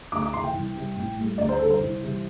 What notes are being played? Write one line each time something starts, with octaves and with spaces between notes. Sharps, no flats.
D2 D6
D6
C3 E3 C6
G5
C2
C3 G3
A1
A2 G3
D2 D5
C5
D3 G3 A4
C5
C2
C3 E3 G3